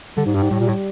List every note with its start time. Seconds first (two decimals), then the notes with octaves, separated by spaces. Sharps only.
0.17 D3 G3
0.26 G#2
0.34 G2 G4
0.43 G#2
0.51 A2 G3
0.60 A#2
0.68 A2 G3